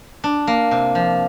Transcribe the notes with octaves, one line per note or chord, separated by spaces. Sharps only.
D4
A#3
C3
F3